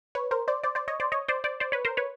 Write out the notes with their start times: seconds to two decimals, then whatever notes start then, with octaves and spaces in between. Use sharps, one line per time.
0.15 B4 C#5
0.31 A#4 C5
0.48 C5 D5
0.64 C5 D5
0.75 C5 D5
0.88 C#5 D#5
1.00 C5 D5
1.12 C#5 D#5
1.28 C5 D5
1.44 C5 D5
1.60 C5 D5
1.72 B4 C#5
1.85 A#4 C5
1.97 B4 C#5